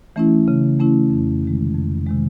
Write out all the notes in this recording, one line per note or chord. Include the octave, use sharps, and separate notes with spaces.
E3 A3 C#4 E4
C#3
E3 A3 C#4 E4
F2
C3 D#3 G#3
F2
C3 D#3 G#3